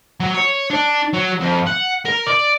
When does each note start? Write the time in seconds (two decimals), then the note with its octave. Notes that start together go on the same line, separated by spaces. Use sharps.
0.20 F#3
0.34 C#5
0.70 D4
1.13 F#3
1.40 F2
1.66 F#5
2.05 A#4
2.27 D5